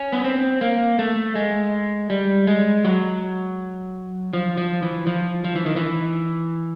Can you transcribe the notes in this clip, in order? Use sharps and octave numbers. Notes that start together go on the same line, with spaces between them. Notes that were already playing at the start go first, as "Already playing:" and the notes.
Already playing: C#4
B3
C4
A#3
A3
G#3
G3
G#3
F#3
F3
F3
E3
F3
F3
E3
D#3
E3